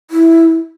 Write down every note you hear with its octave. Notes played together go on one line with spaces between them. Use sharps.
E4